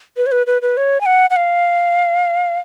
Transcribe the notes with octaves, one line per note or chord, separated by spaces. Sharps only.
B4
C#5
B4
B4
B4
C#5
G#5
F#5
F#5
F5